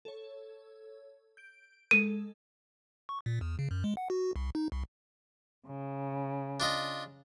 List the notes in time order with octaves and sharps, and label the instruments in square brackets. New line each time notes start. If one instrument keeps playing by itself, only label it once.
[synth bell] A4 C#5
G6 D7
[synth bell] G#3 A4 [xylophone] D#7
[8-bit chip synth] C#6
A#2
E2
C#3
F#2
G#3
F#5
F#4
C2
D#4
C2
[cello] C#3
[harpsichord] D4 F4 D#5